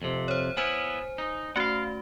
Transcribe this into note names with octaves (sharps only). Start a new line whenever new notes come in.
F2 C3
C5 C#5
B3 E4 C5 G#5
D#4
A3 C#4 F#4 F5 F#5